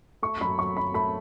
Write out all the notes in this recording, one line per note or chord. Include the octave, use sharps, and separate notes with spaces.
A3 C#6
F#2 B5
F#3 C#6
F#2 B5
A3 B5